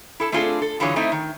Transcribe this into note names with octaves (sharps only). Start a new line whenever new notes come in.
E4 A4 A5
A3 C4 D4 F4 G#4 A4
A4
D3 E3 F#3 F4 G#4 C#5
A3 C4 D#4 E4
D#3